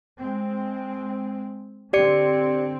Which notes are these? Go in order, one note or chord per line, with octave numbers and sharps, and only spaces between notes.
G#3 C4
D3 C4 G4 D5 C#7